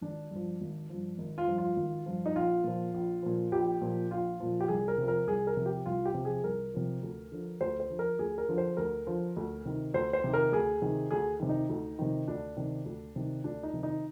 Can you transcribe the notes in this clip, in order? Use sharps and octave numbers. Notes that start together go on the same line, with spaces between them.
G#1 D4
G2 F3
G#1
G2 F3
G#1
F4
G2 F3
F4
G#1
G2 F3
D#4
A#1 F4
A#2 F3
A#1
A#2 F3
A#1 G4
A#2 F3
A#1 F4
A#2 F3
G4
C2 G#4
A#4
C3 F3
A#4
C2 G#4
A#4
C3 F3
G4
C2 F4
G4
C3 F3
G#4
C2 A#4
C3 F3
D2
D3 F3
D2 C5
C5
D3 F3
A#4
D2 G#4
A#4
D3 F3
C5
D2 A#4
D3 F3
D2
C3 D#3
D2 C5
C5
C3 D#3
A#4
D2 G#4
C3 D#3
D2 G#4
C3 D#3
D#4
D2
C3 D#3
D2 D4
C3 D#3
D2
C3 D#3
D2 D4
D#4
C3 D#3
D#4